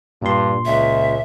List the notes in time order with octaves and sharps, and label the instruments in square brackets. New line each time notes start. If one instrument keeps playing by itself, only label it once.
[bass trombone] G2 [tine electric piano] A#2 C6
[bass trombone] C#2 [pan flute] E5